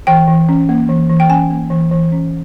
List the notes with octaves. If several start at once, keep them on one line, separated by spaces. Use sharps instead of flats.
E3 G5
E3
C#4
A#3
E3
E3
G5
C#4 G#5
A#3
E3
E3
C#4